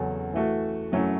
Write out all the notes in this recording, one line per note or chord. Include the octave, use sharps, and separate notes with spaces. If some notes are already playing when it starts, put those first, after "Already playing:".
Already playing: E2 C#3 F#3 C#4 A4
E3 A3 F#4 A4
F#2 F#3 A3 C#4 E4